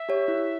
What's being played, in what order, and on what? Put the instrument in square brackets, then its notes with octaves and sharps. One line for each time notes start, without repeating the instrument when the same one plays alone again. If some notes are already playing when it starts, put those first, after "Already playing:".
Already playing: [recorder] E5
[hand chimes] G4 C#5
E4